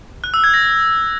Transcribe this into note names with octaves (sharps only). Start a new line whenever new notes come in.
F#6
E6
G#6
A#6